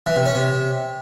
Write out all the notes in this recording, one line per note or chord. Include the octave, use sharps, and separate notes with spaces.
E3
C3
C#4
C3